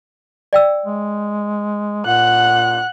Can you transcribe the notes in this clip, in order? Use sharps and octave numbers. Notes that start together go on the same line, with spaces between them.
D5 G5 E6
G#3
A#2 F#5 F#6